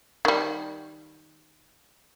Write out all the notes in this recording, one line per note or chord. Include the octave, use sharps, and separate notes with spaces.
D#3 G3